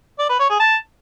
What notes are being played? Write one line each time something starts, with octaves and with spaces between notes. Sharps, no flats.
D5
B4
C#5
G#4
A5